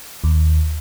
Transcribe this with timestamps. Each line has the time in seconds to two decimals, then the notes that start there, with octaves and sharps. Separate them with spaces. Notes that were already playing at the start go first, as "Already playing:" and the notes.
0.24 D#2